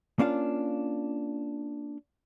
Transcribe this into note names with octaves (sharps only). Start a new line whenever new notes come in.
A#3 C#4 D4 F4 F5